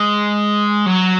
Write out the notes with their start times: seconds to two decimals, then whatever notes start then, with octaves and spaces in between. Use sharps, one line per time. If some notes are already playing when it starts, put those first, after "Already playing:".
Already playing: G#3
0.86 F#3